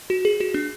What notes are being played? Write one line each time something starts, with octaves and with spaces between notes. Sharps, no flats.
F#4
G#4
F#4
D4